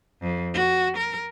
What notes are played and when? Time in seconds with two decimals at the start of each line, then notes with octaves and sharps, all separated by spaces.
0.22 F2
0.54 F#4
0.97 A#4